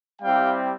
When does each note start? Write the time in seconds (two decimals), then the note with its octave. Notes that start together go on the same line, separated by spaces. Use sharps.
0.21 G3 C4 E4 G4 F5 G5